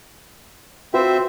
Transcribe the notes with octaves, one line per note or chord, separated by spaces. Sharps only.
C4 F4 F#4 B4 C5 E5